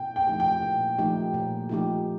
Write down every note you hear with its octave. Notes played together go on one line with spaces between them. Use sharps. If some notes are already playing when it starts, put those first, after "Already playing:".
Already playing: A#2 G5
G5
F3 A3 D#4 G4
G5
A#2
F3 A3 D#4 G4
A#2
F3 A3 D#4 G4